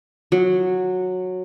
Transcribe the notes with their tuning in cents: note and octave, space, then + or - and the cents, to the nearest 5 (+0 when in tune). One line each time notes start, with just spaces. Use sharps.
F#3 -10